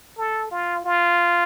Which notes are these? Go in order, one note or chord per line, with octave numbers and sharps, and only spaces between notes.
A4
F4
F4